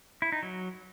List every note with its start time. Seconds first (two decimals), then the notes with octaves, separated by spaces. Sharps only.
0.22 E4
0.32 D#4
0.43 F#3